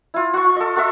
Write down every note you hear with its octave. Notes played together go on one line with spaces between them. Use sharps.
E4 F4
F4 C#6
A4 D#5
F4 A4 D#5 E5